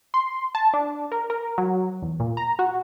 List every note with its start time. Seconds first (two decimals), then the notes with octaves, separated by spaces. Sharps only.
0.14 C6
0.55 A5
0.74 D4
1.12 A#4
1.30 A#4
1.58 F#3
2.02 E2
2.20 A#2
2.37 A#5
2.59 F#4